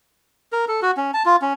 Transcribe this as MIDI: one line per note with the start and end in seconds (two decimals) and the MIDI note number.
0.52 0.65 70
0.68 0.80 69
0.82 0.91 66
0.97 1.11 61
1.14 1.23 81
1.26 1.36 65
1.42 1.53 61